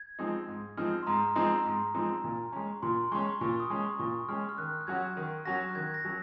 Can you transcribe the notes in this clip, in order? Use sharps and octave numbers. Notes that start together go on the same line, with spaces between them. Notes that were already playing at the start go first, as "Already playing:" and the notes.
Already playing: G#6
F3 G#3 C4 D#4
G#2
F3 G#3 C4 D#4 F6
C6
G#2 A#5
F3 G#3 C4 D#4 A#5
G#2
F3 G#3 C4 D#4
A#2
G#3 C#4
A#2 C6
G#3 C#4 C#6
A#2 C#6
D#6
G#3 C#4
C#6
A#2 C#6
G#3 C#4 F6
F6
D#3 F#6
F#6
F#3 C#4 F#4 G#6
D#3
F#3 C#4 F#4 A#6
F#6
D#3 G#6
A#6
F#3 C#4